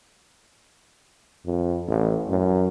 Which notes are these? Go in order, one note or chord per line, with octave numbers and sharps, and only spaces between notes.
F2
A1
F#2